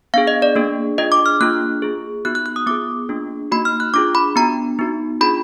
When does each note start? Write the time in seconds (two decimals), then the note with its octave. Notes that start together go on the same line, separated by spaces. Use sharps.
0.14 B3 D4 G#4 F5
0.27 D#5
0.42 D5
0.56 A#3 D4 G#4
0.98 D4 F4 G#4 D#5
1.12 D6
1.26 F6
1.40 A#3 D4 F4 G#4 F#6
1.82 A#3 F4 G#4
2.25 B3 D#4 F#4 F#6
2.35 F#6
2.46 F#6
2.56 D#6
2.67 B3 F4 G#4 D6
3.09 A#3 D4 F4 G#4
3.52 A#3 D#4 F#4 B5
3.65 F6
3.80 F#6
3.94 D4 F4 G#4 D6
4.15 B5
4.36 B3 D4 F#4 A#5
4.79 B3 D#4 F#4
5.21 D4 F4 G#4 B5